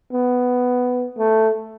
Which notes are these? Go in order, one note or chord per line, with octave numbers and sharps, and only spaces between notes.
B3
A3